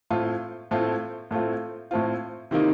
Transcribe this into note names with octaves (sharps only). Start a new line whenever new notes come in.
A2 A3 C4 F4
A2 A3 C4 F4
A2 A3 C4 F4
A2 A3 C4 F4
C3 D#3 A#3 D#4